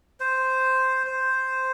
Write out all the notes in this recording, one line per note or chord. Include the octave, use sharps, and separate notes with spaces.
C5
C5